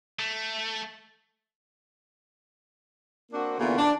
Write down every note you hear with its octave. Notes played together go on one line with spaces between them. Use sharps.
A3
A#3 C4 D4 F#4
E2 A#2 D3 E3 B3 F#4
D4